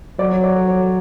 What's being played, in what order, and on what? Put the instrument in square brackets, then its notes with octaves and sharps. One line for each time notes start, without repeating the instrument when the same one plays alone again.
[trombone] F#3 [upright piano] D5
[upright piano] C#5
D5
C#5
C#5